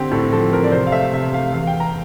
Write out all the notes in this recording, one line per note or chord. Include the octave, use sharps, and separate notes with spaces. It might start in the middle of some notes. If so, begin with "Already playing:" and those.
Already playing: D3 C4 G4
A2 A4
F3 A4
C4 A#4
D5
C3 C5
F5
A3 E5
C3 E5
A3 F5
E2 F5
G5
E2
A#5